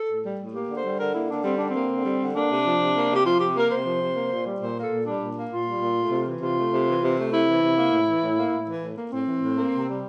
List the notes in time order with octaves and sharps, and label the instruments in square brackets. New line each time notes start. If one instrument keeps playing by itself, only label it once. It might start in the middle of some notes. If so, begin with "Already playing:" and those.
Already playing: [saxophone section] A4
A2
G3
A2
A#3 G4
D3
C5
G3
D3 A#4
A#3 E4
D3 D4
G3 C4
D3 D4
A#3 C4
D3
G3
D3
A#3 D4
C3
F3
C3
A#3
C3 G4
F3 F4
C3 G4
A#3 A#4
C3 C5
F3
C3
A#3
A#2
G3
A#2 C5
A#3
A4
A#2
G3 D4
A#2
A#3
A#2 F4
G3
A#2
A3
C3
E3
C3 F4
A3
C3
E3
C3
A3
C3 E4
E3
C3
A#3
A2
E3
A2
A#3
A2
E3
A2
A#3
A2 C4
E3
A2
A#3
C3
G3